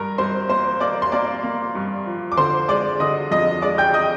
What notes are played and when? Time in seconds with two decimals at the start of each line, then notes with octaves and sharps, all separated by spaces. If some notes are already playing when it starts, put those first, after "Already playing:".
Already playing: G2 A#4 A#5
0.18 G2 C5 C6
0.49 A#3 C5 C6
0.80 A#3 D5 D6
1.02 C6
1.12 A#3 D5 D6
1.43 A#3
1.75 G2
2.06 F3
2.32 D6
2.37 D3 C5 C6
2.68 G#3 D5 D6
3.00 D3 D#5 D#6
3.31 F2 D#5 D#6
3.62 G#3 D5 D6
3.78 G5 G6
3.94 D#5 D#6